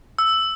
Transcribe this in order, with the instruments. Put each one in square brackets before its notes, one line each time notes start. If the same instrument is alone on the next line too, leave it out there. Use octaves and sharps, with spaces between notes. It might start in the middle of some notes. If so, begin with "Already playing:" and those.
[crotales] E6